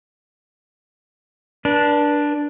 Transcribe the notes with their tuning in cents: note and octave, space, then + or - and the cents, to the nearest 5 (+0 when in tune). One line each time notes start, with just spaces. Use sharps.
D4 +0 B4 -45